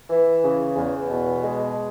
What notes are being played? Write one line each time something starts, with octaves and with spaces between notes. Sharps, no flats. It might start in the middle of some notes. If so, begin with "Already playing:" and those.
E3
C#3
E2
B2
G#3